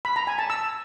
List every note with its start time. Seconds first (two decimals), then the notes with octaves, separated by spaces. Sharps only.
0.05 B5
0.16 A#5
0.27 G#5
0.38 A5
0.50 E6